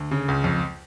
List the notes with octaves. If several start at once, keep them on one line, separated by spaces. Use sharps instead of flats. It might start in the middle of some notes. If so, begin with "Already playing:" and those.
Already playing: D2
C#3
C#2
F2